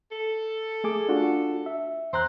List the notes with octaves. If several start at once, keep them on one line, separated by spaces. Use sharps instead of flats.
A4
A3 G#4 D6
D4 F4 F#4
E5
E2 C5 A#5 F#6